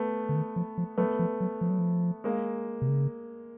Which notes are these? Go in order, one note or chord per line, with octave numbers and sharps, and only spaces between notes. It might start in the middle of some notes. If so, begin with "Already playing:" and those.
Already playing: A3 B3
D3
D#3
F3
F3
F#3 A3 B3
F3
F#3
F3
F#3
F3
G#3 A#3
C3
C#3